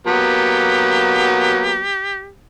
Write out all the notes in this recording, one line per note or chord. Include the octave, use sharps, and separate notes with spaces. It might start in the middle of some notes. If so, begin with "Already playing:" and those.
F#3 A#3 B3 G4